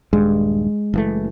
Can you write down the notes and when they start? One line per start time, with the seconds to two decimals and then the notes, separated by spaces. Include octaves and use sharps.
0.13 D#1 G2 G#3
0.94 F#1 E3 A3